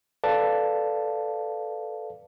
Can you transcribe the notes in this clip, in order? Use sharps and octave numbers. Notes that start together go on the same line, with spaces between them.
A4 B4 D5 F5 A5